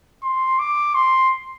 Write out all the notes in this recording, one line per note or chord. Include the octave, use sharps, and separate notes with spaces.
C6
D6
C6